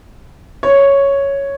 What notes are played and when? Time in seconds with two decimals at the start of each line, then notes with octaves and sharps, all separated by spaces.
0.63 C#5